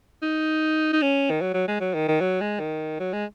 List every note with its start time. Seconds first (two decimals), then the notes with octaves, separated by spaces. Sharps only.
0.22 D#4
0.93 D#4
1.02 C#4
1.30 D#3
1.41 F#3
1.54 F#3
1.68 G#3
1.81 F#3
1.94 D#3
2.08 D#3
2.20 F#3
2.41 G#3
2.59 D#3
3.00 F#3
3.13 G#3